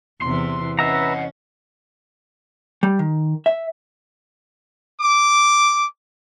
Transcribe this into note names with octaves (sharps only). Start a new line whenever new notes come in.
E2 C3 E3 C6
C#4 B4 D#5 E5 F#5 A#5
G3
D#3
E5
D6